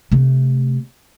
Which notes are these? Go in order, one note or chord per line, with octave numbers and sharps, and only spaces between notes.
C3 A3